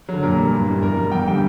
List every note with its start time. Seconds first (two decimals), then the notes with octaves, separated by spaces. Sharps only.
0.09 D3 F#3
0.23 A#2 A#4
0.38 G3
0.53 G2
0.68 E3 G3
0.82 B2 A#4
0.97 G3
1.12 E2 G5
1.27 D3 G3 G5